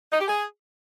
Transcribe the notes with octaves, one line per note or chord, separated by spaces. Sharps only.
D#4
G4
G#4